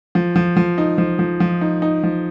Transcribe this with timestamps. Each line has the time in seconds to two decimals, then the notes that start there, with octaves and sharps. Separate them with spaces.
0.15 F3
0.36 F3
0.57 F3
0.78 D#4
0.98 F3
1.19 F3
1.40 F3
1.61 D#4
1.82 D#4
2.03 F3